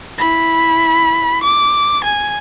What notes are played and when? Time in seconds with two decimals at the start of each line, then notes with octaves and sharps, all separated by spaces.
0.18 E4 B5
1.43 D6
2.04 G#5